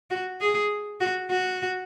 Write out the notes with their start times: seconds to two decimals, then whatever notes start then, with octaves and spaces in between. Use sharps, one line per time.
0.10 F#4
0.41 G#4
1.00 F#4
1.30 F#4